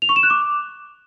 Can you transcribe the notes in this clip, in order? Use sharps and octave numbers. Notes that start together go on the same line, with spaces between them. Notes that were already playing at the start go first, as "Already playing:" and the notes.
F7
C#6
E7
F#6
D6